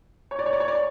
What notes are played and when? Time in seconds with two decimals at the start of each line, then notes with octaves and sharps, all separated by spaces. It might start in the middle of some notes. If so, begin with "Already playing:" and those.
0.31 C#5
0.39 D5
0.46 C#5
0.53 D5
0.60 C#5
0.68 D5
0.75 C#5